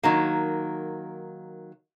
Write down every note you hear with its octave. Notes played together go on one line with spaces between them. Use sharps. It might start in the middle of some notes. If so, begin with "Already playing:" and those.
D#3 F#3 A#3